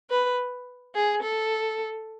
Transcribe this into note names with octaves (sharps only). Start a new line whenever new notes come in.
B4
G#4
A4